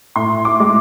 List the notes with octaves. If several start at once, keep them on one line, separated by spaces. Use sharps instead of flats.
A2 C6
D6
G#3